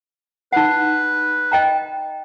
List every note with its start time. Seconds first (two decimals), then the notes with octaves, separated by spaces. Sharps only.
0.53 D#4 B4 F#5
1.52 D#5 G5 A#5